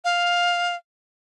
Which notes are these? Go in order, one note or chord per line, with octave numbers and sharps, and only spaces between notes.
F5